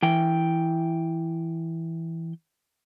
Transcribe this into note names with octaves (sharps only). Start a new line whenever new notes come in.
E3 G5